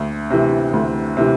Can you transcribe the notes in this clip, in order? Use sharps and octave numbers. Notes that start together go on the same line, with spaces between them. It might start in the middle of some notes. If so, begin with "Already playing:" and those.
Already playing: D2
C3 E3
D2
C3 E3